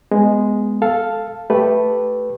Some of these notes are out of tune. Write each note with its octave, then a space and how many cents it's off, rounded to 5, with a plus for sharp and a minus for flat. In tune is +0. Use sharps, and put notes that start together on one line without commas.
G#3 +0 B3 +5
A4 +0 F5 +0
A3 -5 G4 +0 B4 +0